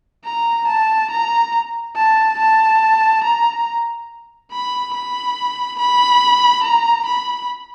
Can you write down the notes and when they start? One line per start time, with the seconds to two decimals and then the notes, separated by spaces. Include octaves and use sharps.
0.25 A#5
0.67 A5
1.11 A#5
1.96 A5
2.39 A5
3.24 A#5
4.51 B5
4.94 B5
5.79 B5
6.64 A#5
7.06 B5